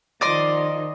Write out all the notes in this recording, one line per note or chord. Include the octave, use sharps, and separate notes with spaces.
D#3 F3 D5 D#5 C6